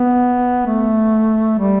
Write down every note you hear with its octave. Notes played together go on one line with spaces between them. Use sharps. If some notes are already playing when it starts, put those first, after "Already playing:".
Already playing: B3
A3
G3